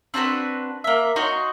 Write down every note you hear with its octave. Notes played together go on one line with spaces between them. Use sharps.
C4 D4 F#4 B4
A#3 E5
D#4 F#4 C#5 C6